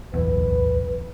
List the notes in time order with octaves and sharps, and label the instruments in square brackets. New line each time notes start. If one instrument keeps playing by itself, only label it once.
[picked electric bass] D1 B1 E2 [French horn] B4